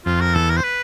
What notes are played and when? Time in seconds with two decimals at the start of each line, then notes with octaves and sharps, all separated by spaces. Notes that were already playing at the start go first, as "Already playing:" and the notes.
0.06 F2 F4
0.21 A#4
0.35 E2 A4
0.50 A#4
0.57 C5
0.64 B4